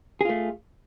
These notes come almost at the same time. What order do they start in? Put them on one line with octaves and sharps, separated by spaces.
G#4 F4 A3